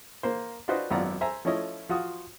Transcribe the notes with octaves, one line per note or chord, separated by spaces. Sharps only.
A#3 C5
D4 F4 F#4 B4 C5 D#5
G#1 F#2 B3 F4 D5 A#5
C5 E5 G#5 A#5
F3 A3 C#4 E4 C#5 D#5
F3 F4 F#4 D#6